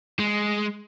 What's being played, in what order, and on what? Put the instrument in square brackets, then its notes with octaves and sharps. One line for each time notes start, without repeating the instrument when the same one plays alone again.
[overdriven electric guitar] G#3